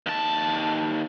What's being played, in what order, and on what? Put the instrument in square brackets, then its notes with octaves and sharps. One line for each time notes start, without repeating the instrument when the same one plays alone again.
[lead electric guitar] D#2 A5